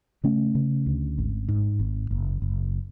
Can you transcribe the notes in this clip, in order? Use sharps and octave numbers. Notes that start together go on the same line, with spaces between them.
C#3 A3 C#4
C#3
D2
G#1
G#2
G#1
F#1
F#1